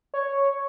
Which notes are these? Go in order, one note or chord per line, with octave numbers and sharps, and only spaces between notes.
C#5